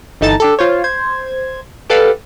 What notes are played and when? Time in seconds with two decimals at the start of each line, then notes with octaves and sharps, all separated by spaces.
0.21 G1 E3 D#4 A4 A5 A6
0.40 D4 G4 A4
0.59 F4 C5 C#5
0.84 C5 G#6
1.90 G4 A4 B4 D5 F5 F#5